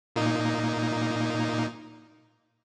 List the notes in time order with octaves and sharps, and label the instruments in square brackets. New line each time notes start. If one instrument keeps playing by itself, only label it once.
[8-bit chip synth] A#2 A#3 D#4